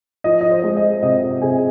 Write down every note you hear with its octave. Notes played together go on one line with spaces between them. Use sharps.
F3 D#5
D#5
C5
G#3
D#5
C3 D#5
C3 G#4 G#5